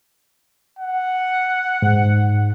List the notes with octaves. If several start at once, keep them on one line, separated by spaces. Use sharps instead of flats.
F#5
G#2